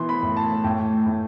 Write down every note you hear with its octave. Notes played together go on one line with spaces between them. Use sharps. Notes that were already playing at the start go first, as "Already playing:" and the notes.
Already playing: B2 E3 C6
B5
A2
A5
A2 G5
A2